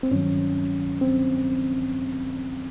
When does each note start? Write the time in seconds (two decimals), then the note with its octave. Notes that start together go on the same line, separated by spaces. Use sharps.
0.03 C4
0.11 G2 D#3 F#3 C#4
1.01 C4